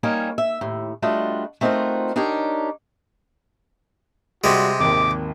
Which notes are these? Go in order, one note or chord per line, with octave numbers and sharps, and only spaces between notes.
G3 A#3 C#4 D#4 A#4 C#5
E5
D#2 A2
G3 A3 D4 F4 F#4 D#5
A3 C4 D#4 F4 F#4 A#4
D4 D#4 G4 A#4 C#5
C3 G3 G#3 F#4
G#1 D#2 D6